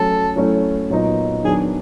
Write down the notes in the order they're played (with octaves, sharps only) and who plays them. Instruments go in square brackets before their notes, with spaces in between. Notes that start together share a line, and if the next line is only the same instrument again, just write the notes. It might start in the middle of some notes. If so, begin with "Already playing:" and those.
Already playing: [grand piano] F#3 A3 C#4 [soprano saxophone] A4
[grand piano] F#3 A3 C#4 E4
A#2 F#3 B3 D#4
[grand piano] D#3 F#3 B3 D4 [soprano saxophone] G#4